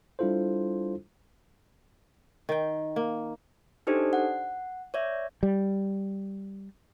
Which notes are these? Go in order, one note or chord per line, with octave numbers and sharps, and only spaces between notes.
G3 D4 E4 F4 A4 C5
D#3 G5
A#3
D4 D#4 G4 A4 C5 D5
F#5
C#5 D5 E5
G3